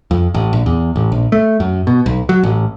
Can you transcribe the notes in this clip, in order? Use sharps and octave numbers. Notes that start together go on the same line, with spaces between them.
F2
A1
A#1
E2
A1
A#1
A3
F#2
B2
B1
F#3
A1